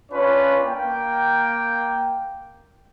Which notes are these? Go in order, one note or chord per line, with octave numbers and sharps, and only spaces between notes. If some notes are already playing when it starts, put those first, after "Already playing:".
C#4 D4 F4 B4 C#5
A#3 G5